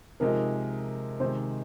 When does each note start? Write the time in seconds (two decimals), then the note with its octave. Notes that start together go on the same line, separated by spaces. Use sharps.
0.20 C3 F3 G#3 D#4 A#4
1.20 C3 D#3 G#3 C5